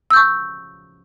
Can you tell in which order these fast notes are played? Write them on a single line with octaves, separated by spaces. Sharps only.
E6 G6 C#6